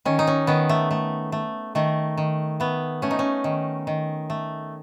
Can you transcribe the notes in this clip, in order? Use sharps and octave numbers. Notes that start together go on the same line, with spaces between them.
D#3 C#4
D#4
C#4
D#3 B3
A3
A3
A3
D#3 A3
D#3
A3 B3
A3 C#4
D#4
C#4
D#3
D#3
A3